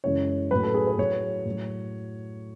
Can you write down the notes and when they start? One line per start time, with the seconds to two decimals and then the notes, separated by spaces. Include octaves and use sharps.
0.04 F#2 C#3 E3 G#3 C#5
0.51 F#3 B4
0.55 A2
0.64 A4
0.74 G#4
0.87 B4
0.98 A2 F#3 C#5
1.45 A2
1.51 F#3